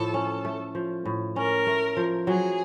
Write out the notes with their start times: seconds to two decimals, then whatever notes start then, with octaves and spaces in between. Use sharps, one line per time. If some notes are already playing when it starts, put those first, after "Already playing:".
Already playing: A2 F3 A3 A4
0.14 C#4
0.45 A3
0.75 F3
1.05 A2
1.36 C#4 A#4
1.67 A3
1.97 F3
2.27 F#3 G#4